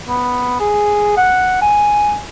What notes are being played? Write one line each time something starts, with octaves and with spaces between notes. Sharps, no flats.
B3
G#4
F#5
G#5